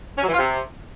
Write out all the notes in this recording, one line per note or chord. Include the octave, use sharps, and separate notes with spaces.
C#4
F#3
E3
F4
C3